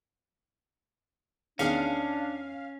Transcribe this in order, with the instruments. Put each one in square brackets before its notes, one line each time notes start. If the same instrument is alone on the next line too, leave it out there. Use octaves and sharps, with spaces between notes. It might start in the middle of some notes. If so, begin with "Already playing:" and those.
[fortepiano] E2 D#3 G#4 [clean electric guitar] C#4 [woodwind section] D4 [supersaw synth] F5